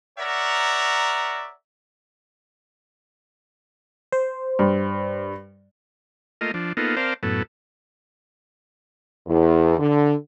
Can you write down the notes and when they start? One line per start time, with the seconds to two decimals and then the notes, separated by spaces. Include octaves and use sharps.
0.18 A#4 C#5 D5 E5 F#5 A#5
4.12 C5
4.59 G2
6.41 A3 A#3 F4 D#5
6.54 F3 D4
6.77 A#3 B3 D#4 F4 A4
6.97 C4 A#4 C5 D5 F5 A5
7.23 F#2 A2 B3 A4
9.27 E2
9.79 D3